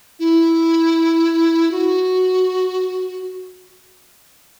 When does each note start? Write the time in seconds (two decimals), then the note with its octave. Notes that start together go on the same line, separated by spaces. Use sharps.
0.19 E4
1.71 F#4